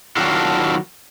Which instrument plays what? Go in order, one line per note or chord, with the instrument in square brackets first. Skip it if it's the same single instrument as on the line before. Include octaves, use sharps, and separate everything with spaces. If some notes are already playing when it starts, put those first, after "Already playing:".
[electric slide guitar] D#3 F#3 D4 F4 F#4 A4